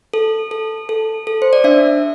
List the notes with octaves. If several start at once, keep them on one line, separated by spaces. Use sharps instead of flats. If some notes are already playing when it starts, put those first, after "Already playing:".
A4
A4
A4
A4
C5
D5
D4 E5